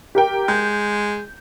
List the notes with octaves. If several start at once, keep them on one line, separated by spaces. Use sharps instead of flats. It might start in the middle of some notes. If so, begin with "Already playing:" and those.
G4 A#4 G5
G#3 G6